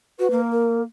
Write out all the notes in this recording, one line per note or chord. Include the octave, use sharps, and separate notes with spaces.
F#4 B4
A#3
A#4